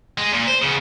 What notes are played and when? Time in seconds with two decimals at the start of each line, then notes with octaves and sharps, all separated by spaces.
0.18 G#3
0.32 A#2
0.48 C5
0.62 C#3 B3